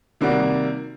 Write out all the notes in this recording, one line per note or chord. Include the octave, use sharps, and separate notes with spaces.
C3 D#3 G3 A#3 F#4